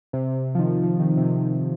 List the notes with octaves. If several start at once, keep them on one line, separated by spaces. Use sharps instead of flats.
C3
F3
D#3
F3
D#3
C3